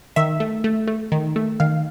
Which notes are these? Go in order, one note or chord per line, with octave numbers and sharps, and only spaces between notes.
D#3 E5
A3
A3
A3
D#3
A3
D#3 F5